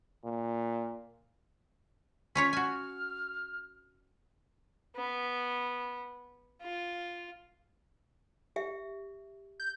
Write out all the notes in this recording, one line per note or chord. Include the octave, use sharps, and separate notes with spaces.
A#2
C#4 F4 C#5 B6
F#4 G#5 F6
B3
F4
G4 E5
G6